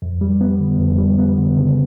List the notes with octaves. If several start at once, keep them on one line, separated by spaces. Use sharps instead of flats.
F2
G3
B3
D3
F2
G3
B3
D3
C#3